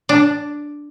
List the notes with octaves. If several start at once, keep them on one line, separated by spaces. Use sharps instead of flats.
D4